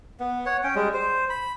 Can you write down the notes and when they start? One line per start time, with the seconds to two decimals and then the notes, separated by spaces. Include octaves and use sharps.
0.20 B3
0.46 C#5 F#5
0.64 C#4 G5
0.75 G3 G#3
0.94 C5
1.30 B5